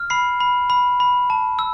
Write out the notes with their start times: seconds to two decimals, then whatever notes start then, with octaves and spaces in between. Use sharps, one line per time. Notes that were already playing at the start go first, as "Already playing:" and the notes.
Already playing: F6
0.10 B5 C7
0.40 B5
0.70 B5
1.00 B5
1.30 A5
1.59 E6